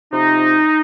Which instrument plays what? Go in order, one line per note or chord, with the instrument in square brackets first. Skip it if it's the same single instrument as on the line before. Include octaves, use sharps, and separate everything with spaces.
[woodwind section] C3 F3 D#4